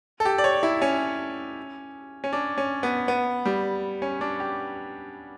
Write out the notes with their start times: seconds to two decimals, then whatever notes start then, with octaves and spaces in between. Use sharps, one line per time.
0.20 A4
0.25 G4
0.38 D5
0.44 C#5
0.63 E4
0.82 C#4
2.24 C#4
2.33 D4
2.58 C#4
2.83 B3
3.08 B3
3.45 G3
4.02 C#4
4.21 D4
4.40 G4